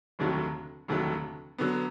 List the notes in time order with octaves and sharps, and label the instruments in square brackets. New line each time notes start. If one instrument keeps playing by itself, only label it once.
[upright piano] F1 D#2 D3 F#3 A3
F1 D#2 D3 F#3 A3
D3 F#3 B3